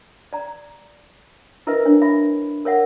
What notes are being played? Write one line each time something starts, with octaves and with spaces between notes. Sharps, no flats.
D5 A#5
E4 A#4 B4 D#5 E5
D4 C#5
E5 B5
A#4 C#5 E5 F#5